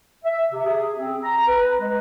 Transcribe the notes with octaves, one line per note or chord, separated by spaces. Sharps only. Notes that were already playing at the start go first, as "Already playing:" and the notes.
E5
C3
G#4
C4
A#5
B4
G#3